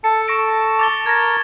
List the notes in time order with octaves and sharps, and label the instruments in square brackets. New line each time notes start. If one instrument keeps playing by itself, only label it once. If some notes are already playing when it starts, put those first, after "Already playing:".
[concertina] A4 A5 [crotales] C#7
[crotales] C#6 A#6 D7
D6 A6 G7
[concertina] A#4 A5 [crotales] G#6 A#6